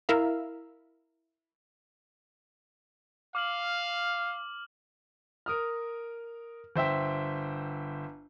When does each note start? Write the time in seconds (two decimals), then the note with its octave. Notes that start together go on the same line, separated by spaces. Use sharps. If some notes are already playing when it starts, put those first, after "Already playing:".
0.09 E4 A#4 E5 F5
3.35 F5 D6 F6 F#7
5.46 A#4 D#6 F6
6.76 G1 C5 E5 G5